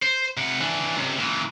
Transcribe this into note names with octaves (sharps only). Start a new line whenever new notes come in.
C5
C3 F#5
E3 D4
C#2 C3
A#2 E3